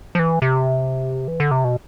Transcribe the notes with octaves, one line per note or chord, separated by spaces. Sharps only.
F3
E3
C3
E3
D3
C3
B2